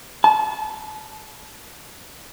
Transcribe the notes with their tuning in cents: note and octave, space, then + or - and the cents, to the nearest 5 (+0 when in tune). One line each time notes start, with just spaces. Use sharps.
A5 -30